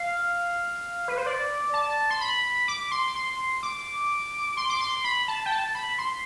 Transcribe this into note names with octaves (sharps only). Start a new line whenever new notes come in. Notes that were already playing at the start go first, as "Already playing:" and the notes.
Already playing: F5
B4
C5
D5
A5
C6
B5
D6
C6
C6
D6
C6
D6
C6
B5
A5
G5
A5
B5
C6